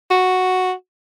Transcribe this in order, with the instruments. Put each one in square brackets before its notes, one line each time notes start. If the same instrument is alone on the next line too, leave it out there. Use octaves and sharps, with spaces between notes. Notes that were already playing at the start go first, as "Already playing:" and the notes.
[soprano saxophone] F#4